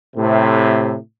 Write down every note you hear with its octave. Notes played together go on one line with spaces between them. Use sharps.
A2 C3